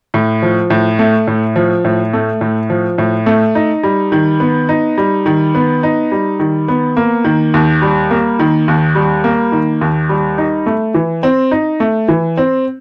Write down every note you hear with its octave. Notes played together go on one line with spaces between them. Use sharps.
A2
F3
A2
A3
A2
F3
A2
A3
A2
F3
A2
A3
D#4
G3
D#3
B3
D#4
G3
D#3
B3
D#4
G3
D#3
B3
A#3
D#3
D#2
G3
A#3
D#3
D#2
G3
A#3
D#3
D#2
G3
D#4
A3
E3
C4
D#4
A3
E3
C4